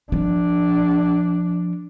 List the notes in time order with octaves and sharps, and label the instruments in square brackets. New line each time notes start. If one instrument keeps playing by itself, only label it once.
[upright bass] F3 [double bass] D4